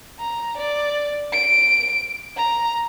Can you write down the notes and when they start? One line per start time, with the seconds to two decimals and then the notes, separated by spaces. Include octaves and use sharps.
0.19 A#5
0.57 D5
1.32 D7
2.36 A#5